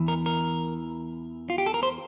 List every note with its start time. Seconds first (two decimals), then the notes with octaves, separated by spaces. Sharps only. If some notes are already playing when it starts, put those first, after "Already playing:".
Already playing: E2 E3
0.08 A#4
0.26 A#4
1.50 F4
1.58 G4
1.66 A4
1.74 A#4
1.83 C5